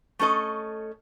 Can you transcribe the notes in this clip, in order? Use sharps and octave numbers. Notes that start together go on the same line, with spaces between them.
A3 C#4 A4 D#5